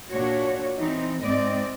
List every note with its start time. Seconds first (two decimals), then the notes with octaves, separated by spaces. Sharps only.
0.12 A#2 D4 F#4 C#5
0.79 E3 C4 D#4
1.21 G#2 C4 D5 D#5